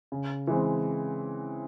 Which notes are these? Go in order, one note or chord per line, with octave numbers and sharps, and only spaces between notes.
C#3
E3 G#3 C4